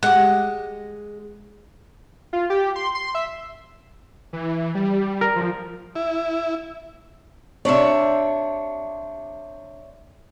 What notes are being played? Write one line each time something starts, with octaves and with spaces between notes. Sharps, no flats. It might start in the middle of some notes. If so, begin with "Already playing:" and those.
G#3 G4 F#5
F4
G4
C6
C6
E5
E3
G3
A#4
F3
E4
C3 D4 C#5 D5 E5